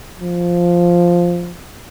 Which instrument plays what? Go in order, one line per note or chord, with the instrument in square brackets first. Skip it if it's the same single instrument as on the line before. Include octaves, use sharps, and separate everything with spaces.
[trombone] F3